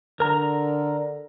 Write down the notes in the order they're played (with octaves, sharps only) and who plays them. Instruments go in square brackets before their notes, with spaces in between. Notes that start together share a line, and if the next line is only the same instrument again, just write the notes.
[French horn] D3 [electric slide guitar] A#4 A#5